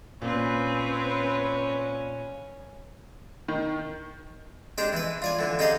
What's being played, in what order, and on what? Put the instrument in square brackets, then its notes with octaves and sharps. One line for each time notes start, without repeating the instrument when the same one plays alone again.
[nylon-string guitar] A#2 [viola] C4 B4 [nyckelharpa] C#4 C#5
[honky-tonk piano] D#3
[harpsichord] G#3 D4 G4 D5
E3 B4
F4 D5 G#5
D3 E3
D#4 G4 G#4 D#5 F5